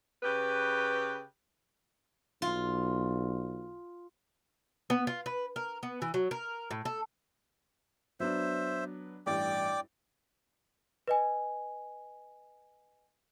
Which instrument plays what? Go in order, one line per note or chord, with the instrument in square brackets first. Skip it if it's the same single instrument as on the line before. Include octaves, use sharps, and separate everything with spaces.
[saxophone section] C#3 G4 B4
[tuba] B1 [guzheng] F4
[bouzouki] B3
F4
B4
A#4
B3
E3
F#3
A#4
A2
A4
[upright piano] F#3 B3 D4 [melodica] C5 E5
[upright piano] A1 G2 [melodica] D5 G5 D6
[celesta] B4 D#5 G#5